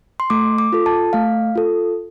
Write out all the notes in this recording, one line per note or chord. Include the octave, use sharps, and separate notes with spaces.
C6
A3 D6
D6
F4 A4
A5
A3 F5
F4 A4